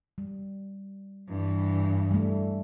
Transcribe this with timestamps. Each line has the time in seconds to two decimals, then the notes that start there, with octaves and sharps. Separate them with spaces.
0.18 G3
1.29 G2 E3
2.11 G3 A3